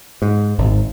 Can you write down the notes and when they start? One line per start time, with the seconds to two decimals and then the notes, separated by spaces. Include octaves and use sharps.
0.22 G#2
0.58 G#1